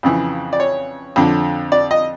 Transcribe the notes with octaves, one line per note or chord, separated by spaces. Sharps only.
F2 C#3 E3
D5
C#5
F2 D3
D5
D#5